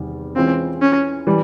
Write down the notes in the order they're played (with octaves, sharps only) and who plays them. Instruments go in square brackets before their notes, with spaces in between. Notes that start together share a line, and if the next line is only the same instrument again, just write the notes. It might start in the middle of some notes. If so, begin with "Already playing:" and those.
Already playing: [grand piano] E2 C3 D#3 G3
[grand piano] E3 G#3 C#4 F4 [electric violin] C4
[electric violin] C#4
[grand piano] E3 G3